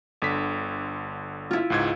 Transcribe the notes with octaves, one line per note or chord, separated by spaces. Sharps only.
G1 D3 B6
E4 F4
C#2 G#2 G#6